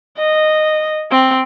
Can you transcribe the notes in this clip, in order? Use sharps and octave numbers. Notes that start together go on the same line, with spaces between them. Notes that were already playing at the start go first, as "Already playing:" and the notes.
D#5
C4